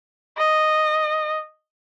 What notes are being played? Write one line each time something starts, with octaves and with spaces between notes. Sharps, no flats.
D#5